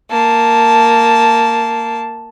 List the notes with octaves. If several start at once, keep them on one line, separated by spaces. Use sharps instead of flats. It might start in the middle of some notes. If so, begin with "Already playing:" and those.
A#3 A5